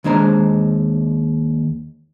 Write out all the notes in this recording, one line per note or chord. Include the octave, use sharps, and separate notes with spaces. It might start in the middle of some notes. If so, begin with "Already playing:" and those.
D#2 G#3 D4 C5 A#5